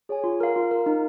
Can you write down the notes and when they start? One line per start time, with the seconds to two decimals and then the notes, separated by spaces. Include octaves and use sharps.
0.09 G#4 C#5 G#5
0.24 F4
0.40 A#4 F5
0.56 F4
0.71 A#4 F5
0.86 D#4